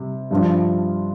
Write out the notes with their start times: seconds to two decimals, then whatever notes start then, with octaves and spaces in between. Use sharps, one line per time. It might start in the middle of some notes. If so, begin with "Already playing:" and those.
Already playing: C3 G3
0.31 G2 F3 D4 F4